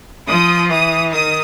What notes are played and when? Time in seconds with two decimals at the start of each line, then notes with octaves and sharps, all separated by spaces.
0.27 F3 D#6
0.70 E3 D#6
1.13 D#3 D#6